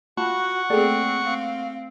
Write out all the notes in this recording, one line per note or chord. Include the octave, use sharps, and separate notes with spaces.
F4 F#4 F#5 A5 B5 C#6
A3 A#3 C4 G#4 A4 D5 G5
C4 F5